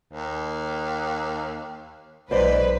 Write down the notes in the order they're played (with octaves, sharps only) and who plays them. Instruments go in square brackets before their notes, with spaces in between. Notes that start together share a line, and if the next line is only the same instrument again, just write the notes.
[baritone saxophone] D#2
[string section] B1 B4 [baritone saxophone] G#2 [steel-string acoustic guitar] C5 D5 D#5